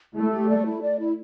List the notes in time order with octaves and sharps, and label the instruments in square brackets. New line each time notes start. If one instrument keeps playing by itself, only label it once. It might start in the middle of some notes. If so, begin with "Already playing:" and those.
[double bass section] A3 [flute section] E4
[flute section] G4
D5
E4
D5
E4